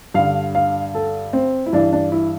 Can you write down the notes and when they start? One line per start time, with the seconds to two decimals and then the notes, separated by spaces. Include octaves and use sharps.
0.14 G2 D3 F5
0.55 F5
0.95 A4
1.33 C4
1.66 E4
1.73 G2 E3 D4
1.93 D4
2.12 E4